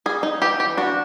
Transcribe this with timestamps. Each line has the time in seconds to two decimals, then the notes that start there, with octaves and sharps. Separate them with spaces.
0.06 G3 G#4
0.23 D#4
0.42 E3 G4
0.60 G4
0.77 D4 F#4